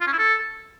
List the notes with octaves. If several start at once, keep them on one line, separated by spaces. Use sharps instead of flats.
F4
C#4
E4
A4